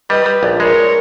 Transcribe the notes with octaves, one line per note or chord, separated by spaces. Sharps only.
G3 B4 D#5
G3
A#1
G#3 A#4 C#5